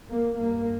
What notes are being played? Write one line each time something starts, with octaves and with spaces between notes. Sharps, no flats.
A#3
G2 A#3